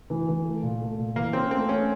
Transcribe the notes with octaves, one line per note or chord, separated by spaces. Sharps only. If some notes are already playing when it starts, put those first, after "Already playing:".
E3
E3
A3
A#2
A3
A#2
E3 A#3
C4 C#4
A3 C4
A3 C#4